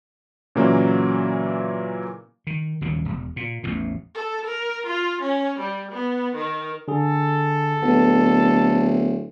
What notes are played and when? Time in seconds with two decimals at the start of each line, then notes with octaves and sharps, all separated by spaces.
0.55 A#2 C#3 E3 F#3 A#3
2.47 D#3
2.81 D#1 D#2 C#3
3.05 E1
3.36 A#2
3.63 A1 E2 A2
4.14 A4
4.47 A#4
4.86 F4
5.21 C#4
5.59 G3
5.91 B3
6.36 D#3
6.88 D3 G#4 A4
7.82 D1 B3